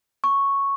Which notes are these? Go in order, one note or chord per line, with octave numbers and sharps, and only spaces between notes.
C#6